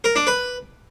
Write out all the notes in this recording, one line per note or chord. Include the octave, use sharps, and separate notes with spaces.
A#4
D4
B4